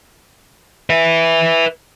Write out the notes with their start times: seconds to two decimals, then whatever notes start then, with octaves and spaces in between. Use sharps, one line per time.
0.90 B4 E5